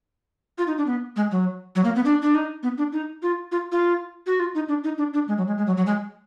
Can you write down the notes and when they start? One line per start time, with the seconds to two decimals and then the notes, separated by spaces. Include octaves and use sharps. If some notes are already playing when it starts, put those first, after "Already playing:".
0.58 F4
0.67 D#4
0.78 D4
0.87 B3
1.16 G#3
1.31 F#3
1.76 F#3
1.85 A#3
1.95 B3
2.05 D4
2.22 D4
2.35 D#4
2.63 B3
2.78 D4
2.92 D#4
3.23 F4
3.52 F4
3.72 F4
4.27 F#4
4.40 F4
4.55 D#4
4.69 D4
4.84 D#4
4.98 D4
5.14 D4
5.28 G#3
5.38 F#3
5.47 G#3
5.58 G#3
5.67 F#3
5.77 F#3
5.86 G#3